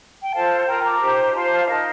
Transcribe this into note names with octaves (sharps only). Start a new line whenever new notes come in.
G5
F4 A4 C5 F5 A5
F4 A#4 G5 A#5
A#5 D6
D#4 G4 C5
F4 C5 A5 C6
F5 A5
D#4 A#4 F5 A5